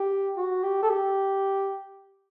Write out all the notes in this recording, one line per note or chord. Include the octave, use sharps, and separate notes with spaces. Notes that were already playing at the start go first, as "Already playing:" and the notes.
Already playing: G4
F#4
G4
A4
G4